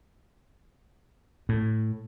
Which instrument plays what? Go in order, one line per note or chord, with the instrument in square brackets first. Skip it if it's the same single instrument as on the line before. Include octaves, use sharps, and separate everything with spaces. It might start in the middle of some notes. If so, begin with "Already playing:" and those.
[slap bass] A2